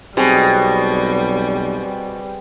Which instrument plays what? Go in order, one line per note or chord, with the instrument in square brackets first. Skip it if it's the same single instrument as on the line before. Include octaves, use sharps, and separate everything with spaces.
[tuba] B1 [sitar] B2 [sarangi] G3 [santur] C4 G4 G#4